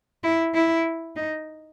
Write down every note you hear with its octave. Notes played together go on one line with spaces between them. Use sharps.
E4
E4
D#4